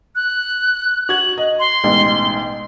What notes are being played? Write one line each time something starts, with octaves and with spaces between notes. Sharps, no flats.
F#6
F#4 G#6 F#7
D#5
C6
A1 G#2 B2